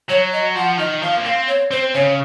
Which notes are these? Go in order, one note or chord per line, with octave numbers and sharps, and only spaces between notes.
F#3 C#5
D#5
F3 F#5
D#3 D#5
F3 F5
A#3
C4 F5
C#5
C4 C5
C#3 C#5